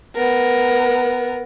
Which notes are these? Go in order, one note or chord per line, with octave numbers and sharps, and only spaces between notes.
B3 A#4